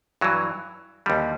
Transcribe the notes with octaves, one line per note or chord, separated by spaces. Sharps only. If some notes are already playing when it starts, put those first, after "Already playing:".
G2 E3 F#3
D#2 D3 G3